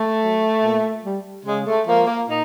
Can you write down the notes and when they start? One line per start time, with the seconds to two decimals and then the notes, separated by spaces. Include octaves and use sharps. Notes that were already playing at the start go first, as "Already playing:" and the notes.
Already playing: A3
0.22 F#3
0.63 A#2
1.04 G3
1.45 C#3 G#3
1.66 A3
1.86 F3 G#3 A#3
2.07 A#3
2.27 A#2 D#4